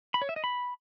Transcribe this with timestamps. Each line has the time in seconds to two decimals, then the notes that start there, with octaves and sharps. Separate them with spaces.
0.14 B5
0.22 C#5
0.29 E5
0.36 D#5
0.44 B5